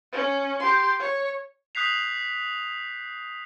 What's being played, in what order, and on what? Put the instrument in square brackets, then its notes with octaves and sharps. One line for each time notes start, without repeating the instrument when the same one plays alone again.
[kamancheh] C#4
G4 C6
C#5
[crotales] D#6 F#6 G6 B6 C7 F7